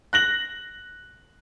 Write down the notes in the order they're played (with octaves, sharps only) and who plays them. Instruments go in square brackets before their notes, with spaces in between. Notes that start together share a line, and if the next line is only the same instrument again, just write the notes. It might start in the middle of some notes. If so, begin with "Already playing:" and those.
[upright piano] F#6 A#6 F#7